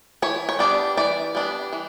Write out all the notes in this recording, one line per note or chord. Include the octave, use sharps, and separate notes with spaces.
E3 C#5
C#5
G3 B3 D4 D5
E3 D5
G3 B3 D4
E3